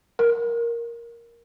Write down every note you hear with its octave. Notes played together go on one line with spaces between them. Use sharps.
A#4